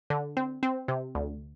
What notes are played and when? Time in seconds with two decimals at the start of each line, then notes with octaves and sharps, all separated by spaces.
0.10 D3
0.37 C4
0.63 C4
0.88 C3
1.15 D2